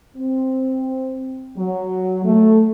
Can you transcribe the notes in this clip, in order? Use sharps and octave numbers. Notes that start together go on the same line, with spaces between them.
C4
F#3
A3